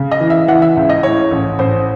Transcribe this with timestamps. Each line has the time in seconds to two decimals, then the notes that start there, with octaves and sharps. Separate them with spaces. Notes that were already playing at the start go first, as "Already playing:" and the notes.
Already playing: C#3
0.11 D#5
0.20 E3
0.30 E5
0.48 E3 F#5
0.62 E5
0.76 C#2
0.89 D#5
1.03 A2 C#5
1.31 A1
1.59 A1 C5